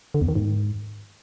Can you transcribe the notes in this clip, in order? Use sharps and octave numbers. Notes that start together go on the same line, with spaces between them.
D3
E2
D#3
G#2